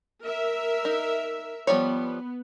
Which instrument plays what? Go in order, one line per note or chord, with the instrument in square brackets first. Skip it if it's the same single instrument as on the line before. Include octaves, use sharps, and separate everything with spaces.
[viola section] A#4 E5
[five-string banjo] D#4
[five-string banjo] F3 G3 C#5 [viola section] B3